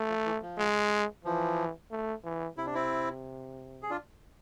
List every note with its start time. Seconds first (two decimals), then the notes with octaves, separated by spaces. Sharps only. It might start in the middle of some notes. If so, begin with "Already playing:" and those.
Already playing: A3
0.09 F3
0.26 E3
0.42 F3
0.58 G#3
1.25 E3 F3
1.91 A3
2.24 E3
2.58 C3 E4
2.66 D4
2.74 C4 E4
3.83 G#4
3.90 D4 F4